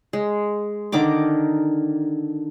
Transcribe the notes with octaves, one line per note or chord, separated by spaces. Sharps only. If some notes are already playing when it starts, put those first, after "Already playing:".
G#3
D3 D#3 A#4 D6